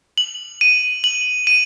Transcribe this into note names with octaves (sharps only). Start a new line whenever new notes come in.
F#7
D#7
F#7
D#7